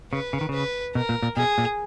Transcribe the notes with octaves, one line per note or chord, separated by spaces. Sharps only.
C#3 B4
C#3
D#3
C#3 B4
B2 A#4
A#2
A#2
B2 G#4
A#2